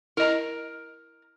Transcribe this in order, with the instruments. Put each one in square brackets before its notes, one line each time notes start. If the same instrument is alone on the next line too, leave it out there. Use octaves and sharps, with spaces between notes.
[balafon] E4 D#5 [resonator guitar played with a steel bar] A#4 A#5